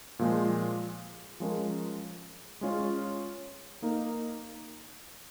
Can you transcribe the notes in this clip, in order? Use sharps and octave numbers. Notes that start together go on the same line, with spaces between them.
A#2 F3 G#3
F3 G#3 C#4 A#4
G#3 C#4 F4 C#5
A#3 D#4 A#4